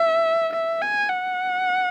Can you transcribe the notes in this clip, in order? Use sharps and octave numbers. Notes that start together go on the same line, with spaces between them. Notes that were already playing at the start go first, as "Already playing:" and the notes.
Already playing: E5
E5
G#5
F#5